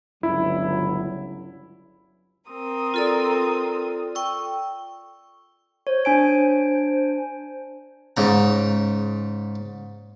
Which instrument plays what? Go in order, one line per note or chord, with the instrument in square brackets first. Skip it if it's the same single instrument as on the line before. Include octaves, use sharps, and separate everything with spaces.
[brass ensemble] G1 C#2 F#3 [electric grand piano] E4
[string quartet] C4 A#4 D#6
[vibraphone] F4 A4 D5
G5 C#6 E6
[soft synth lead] C5 [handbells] C#5
[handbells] D4 G#5 D7
[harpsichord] G#2 C#3 A#5